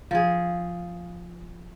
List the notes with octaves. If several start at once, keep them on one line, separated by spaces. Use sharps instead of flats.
F3 G#4